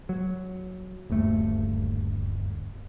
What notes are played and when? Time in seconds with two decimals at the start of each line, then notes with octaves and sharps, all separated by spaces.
0.09 F#3
1.10 D#1 D2 G2 A3